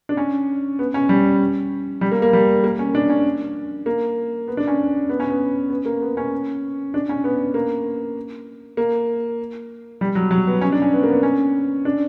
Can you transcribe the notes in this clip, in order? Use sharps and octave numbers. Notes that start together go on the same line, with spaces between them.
D4
C#4
B3
C#4
G3
G3
A#3
A#3
G3
A#3
C#4
D4
C#4
A#3
B3
D4
C#4
B3
C#4
B3
B3
A#3
B3
C#4
D4
C#4
B3
A#3
A#3
G3
F#3
F#3
B3
C#4
D4
C#4
B3
A#3
B3
C#4
D4